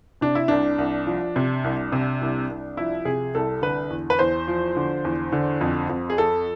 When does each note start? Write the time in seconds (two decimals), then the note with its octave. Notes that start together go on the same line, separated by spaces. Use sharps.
0.21 C3 D4
0.35 E4
0.48 C2 D4
0.78 C2
1.06 F3
1.36 C3
1.64 C2
1.92 C3
2.21 C2
2.49 C2
2.77 F3 E4
3.05 C3 G#4
3.35 C2 A4
3.62 D3 B4
3.90 E2
4.10 B4
4.19 E2 C5
4.48 F3
4.77 D3
5.05 E2
5.32 D3
5.61 F2
5.89 F2
6.10 G#4
6.18 F3 A4